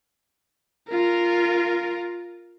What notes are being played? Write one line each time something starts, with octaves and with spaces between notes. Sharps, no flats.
F4 A#4